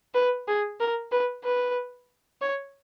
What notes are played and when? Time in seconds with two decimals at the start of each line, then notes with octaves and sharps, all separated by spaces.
0.14 B4
0.48 G#4
0.80 A#4
1.12 B4
1.44 B4
2.41 C#5